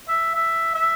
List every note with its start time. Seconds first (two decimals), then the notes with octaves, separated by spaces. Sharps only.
0.08 E5
0.35 E5
0.74 E5